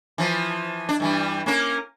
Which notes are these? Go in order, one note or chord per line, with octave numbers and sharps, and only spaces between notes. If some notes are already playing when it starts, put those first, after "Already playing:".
E3 F3
D4
G2 E3 G3
A#3 C#4 A#4